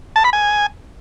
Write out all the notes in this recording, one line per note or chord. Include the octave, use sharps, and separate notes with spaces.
A5
B5
G#5